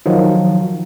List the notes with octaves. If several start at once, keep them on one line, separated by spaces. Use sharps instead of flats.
D#3 F3 F#3